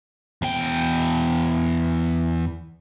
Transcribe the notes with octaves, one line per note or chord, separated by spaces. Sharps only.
E2 G5